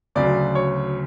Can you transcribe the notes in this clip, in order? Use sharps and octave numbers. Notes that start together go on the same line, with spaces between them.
D2 C#3 F#3 D5
C#5